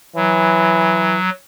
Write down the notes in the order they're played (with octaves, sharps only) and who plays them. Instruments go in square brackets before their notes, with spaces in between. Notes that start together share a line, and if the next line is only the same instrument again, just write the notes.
[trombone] E3 [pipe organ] F#3